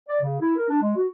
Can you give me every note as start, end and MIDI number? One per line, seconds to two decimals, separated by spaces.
0.08 0.17 74
0.21 0.36 49
0.41 0.57 64
0.57 0.67 70
0.69 0.79 62
0.81 0.93 56
0.96 1.06 66